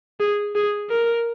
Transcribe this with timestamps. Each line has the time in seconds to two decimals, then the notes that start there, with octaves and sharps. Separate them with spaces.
0.20 G#4
0.55 G#4
0.90 A#4